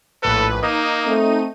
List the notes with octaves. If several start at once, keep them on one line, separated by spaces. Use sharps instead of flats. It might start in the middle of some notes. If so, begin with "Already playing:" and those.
A#1 A2 A4 B4
A#3 D#4 D#7
A3 C4